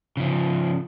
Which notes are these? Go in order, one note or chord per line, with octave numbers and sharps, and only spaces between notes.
C#3 F3